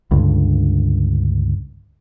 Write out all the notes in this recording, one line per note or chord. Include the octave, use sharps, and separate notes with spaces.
C#2 G2 D3